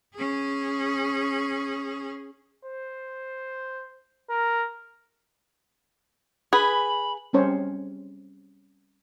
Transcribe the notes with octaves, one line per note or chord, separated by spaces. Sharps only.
C#4 G#4
C5
A#4
G#4 B4 B5
G3 C4 C#4 C5 C#5